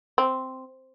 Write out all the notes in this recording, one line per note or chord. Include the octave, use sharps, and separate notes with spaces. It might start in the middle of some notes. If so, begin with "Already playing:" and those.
C4